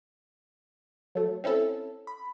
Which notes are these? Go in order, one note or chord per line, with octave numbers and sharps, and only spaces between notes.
F#3 A3
C4 C#4 E4 A4
B5